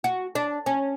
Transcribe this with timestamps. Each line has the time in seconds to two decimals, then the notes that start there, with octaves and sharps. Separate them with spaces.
0.04 F#4
0.35 D4
0.66 C#4